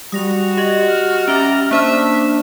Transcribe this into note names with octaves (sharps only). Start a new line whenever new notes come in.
G3 F#4 D#6 A#6 F7
G4 D#5
F6
G3 C#4 G4 E5 A#5 A6
A#3 D4 C5 E5 F6